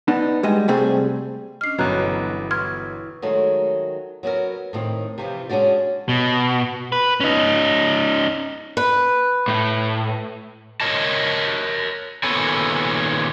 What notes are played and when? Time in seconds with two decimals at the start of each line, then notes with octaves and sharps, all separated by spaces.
0.08 B3 D4 D#4
0.43 G3 G#3 D#5
0.68 C3 G3 A3 C4 G#4 C5
1.61 C#4 D4 D#5 F6 C7
1.78 G1 B2 E3 F#3 A4 C#5 A#5 F#6
2.51 E4 B4 C6 C#6 F6 G#6
3.22 D#3 F#3 G#3 A3
4.23 F#3 B3 C#4 A#4
4.73 A2 D#3 C4
5.18 C3 E3 F3
5.49 G#3 C#4 D4 F#4 D5
6.09 B2
6.92 B4
7.20 C#4 D#4
8.77 B4
9.48 A2
10.81 A#4 C#5 D#5 A5
12.23 A#2 D#3 B3 A4 C#5 G#5